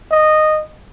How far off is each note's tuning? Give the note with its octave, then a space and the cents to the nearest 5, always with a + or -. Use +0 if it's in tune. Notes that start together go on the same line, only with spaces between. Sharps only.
D#5 -10